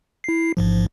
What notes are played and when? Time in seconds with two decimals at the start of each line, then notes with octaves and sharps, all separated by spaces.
0.24 E4 C7
0.57 A1 G#2 F3